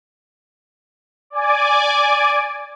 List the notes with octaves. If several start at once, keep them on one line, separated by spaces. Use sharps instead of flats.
D5 G#5 D6